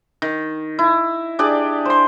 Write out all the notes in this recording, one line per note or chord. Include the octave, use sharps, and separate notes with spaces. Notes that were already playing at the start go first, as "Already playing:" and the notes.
D#3
E4
D4 G4 G#4 D5
C5 C6